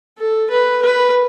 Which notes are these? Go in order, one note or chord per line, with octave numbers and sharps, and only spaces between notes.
A4
B4
B4